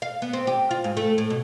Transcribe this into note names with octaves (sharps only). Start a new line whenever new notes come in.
F5
B3
C4
G4
F4
G#2
A3
A2
B2